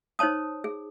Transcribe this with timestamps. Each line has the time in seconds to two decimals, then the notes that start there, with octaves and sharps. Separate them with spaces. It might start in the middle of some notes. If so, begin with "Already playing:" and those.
0.19 D#4 C5 C#5 A5 D#6
0.64 G#4